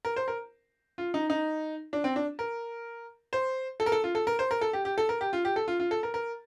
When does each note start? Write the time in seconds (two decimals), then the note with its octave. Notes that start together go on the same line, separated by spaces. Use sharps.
0.05 A#4
0.16 C5
0.28 A#4
0.98 F4
1.14 D#4
1.30 D#4
1.93 D4
2.04 C4
2.16 D4
2.39 A#4
3.33 C5
3.80 A4
3.86 A#4
3.92 A4
4.04 F4
4.15 A4
4.27 A#4
4.39 C5
4.51 A#4
4.61 A4
4.73 G4
4.85 G4
4.98 A4
5.09 A#4
5.21 G4
5.33 F4
5.45 G4
5.56 A4
5.68 F4
5.80 F4
5.91 A4
6.03 A#4
6.14 A#4